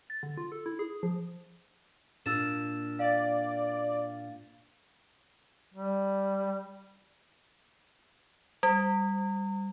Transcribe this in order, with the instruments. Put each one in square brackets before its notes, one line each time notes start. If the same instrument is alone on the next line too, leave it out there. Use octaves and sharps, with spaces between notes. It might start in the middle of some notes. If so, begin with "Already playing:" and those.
[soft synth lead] A6
D3
F4
A4
E4
G#4
F3
[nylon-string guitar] A#2 A#3 D4 [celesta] E6 A6 E7
[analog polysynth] D5 [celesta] F5 A6
[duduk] G3
[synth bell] G3